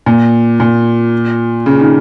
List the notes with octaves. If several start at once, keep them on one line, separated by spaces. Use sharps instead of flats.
A#2
A#2
C#3
D#3